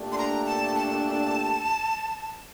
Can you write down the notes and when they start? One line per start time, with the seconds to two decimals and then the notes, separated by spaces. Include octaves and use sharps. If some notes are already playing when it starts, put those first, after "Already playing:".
Already playing: A#2 A3 D4 G4
0.12 C6
0.18 A#5
0.46 A5
0.76 A5